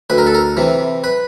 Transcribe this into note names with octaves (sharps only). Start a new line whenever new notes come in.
D2 B4
A#4
A4
A#4
C3 E3
B4